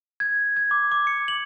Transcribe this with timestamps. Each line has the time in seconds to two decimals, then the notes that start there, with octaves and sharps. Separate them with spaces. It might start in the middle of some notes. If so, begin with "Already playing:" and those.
0.20 G#6
0.57 G#6
0.71 D6
0.92 D6
1.07 C#7
1.28 F#7